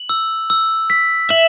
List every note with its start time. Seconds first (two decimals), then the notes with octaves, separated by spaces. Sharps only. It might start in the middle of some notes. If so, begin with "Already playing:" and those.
Already playing: F#7
0.09 E6
0.50 E6
0.90 B6
1.30 E5 F#7